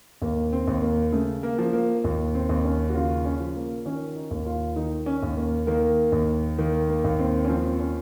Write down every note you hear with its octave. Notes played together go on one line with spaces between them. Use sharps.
D#2 A#3
C4
D#2
A#3
C#3 A3
A#3
F3
A#3
D#2
C4
D#2
C#4
F#4
C#3 F4
C#4
F3
A#3
D#3 C#4
D#4
D#2
F4
D#3 D#4
C#4
D#2
A#3
D#3 A#3
D#2
D#3 A#3
A#3
D#2
C4
C#4
F3 C4
C#4